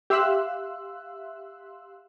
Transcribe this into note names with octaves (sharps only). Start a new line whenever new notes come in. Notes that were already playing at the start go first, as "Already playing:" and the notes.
G4 E5 F5 C6 E6 F#6